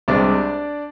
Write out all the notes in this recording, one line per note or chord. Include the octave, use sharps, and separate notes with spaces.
C2 C3 G#3 D4 D5